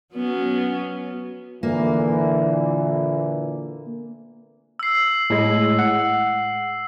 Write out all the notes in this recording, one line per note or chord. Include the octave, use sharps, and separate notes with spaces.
F#3 B3 C#4
A#2 D3 E3 A#3
E6 C7
A2 G#3
F#5